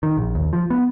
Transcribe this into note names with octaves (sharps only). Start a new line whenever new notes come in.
D#3
A#1
D#2
F3
B3